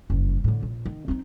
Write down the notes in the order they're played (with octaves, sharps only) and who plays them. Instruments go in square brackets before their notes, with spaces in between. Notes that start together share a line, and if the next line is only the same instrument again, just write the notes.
[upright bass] F#1 G2
A2 D3
A#1
D#3
C4 D#4